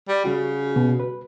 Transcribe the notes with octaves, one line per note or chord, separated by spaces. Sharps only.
G3
C#3 G3 F#4
B2
B4